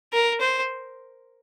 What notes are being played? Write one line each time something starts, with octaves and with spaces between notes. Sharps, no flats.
A#4
C5